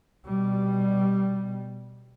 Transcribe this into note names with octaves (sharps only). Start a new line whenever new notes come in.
B2 G3